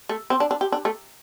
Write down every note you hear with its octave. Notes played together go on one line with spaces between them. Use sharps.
A3
C4
D4
D4
G4
D4
A3